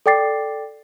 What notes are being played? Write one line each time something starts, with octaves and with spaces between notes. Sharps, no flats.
A4 D5 G5 D6 A6 C7